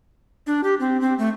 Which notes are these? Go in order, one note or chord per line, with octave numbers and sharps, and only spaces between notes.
D4
G4
C4
C4
A3